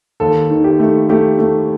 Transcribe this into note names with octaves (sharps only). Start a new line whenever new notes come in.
D#2 A4
D#3
G4
A3
A3 G4
A3